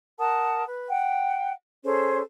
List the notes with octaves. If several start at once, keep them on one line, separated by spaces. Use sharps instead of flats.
A#4 F#5 A5 D#6
B4
F#5 G5
C#4 G#4 A4 C5